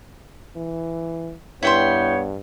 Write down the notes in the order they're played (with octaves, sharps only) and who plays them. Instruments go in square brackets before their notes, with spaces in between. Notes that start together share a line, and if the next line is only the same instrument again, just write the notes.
[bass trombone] E3
[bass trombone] G2 [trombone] B3 [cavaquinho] E4 G5 C6 [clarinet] C#5